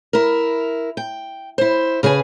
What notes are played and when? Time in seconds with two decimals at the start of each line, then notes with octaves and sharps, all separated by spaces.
0.13 E4 A#4
0.97 G5
1.58 E4 C5
2.03 C#3 G#4 B4 G#5